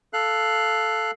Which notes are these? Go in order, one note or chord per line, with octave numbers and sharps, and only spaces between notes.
A4 F5 F#6